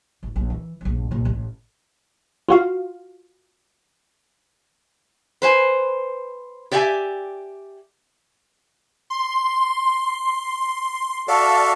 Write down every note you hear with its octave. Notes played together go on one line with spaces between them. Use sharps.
G#1
A#1
E3
A#1 G2
C2 A#2
A1
F4 F#4 F5
B4 C5 G#5
G4 D5 E5 F#5 G#5
C6
F#4 A4 D5 E5 F5 A5